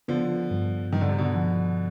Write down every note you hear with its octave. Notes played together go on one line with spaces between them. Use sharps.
D3 F3 B3
G2
G2 D#3
D3
C3
B2 D3
F3